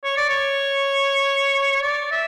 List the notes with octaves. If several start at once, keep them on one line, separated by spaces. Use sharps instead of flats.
C#5
D5
C#5
D5
E5